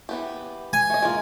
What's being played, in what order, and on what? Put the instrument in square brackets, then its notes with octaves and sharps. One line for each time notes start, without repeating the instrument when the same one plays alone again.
[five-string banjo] E3 B3 G4
[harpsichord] G#5
[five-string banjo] A3 D#5
G#3 A#3 F4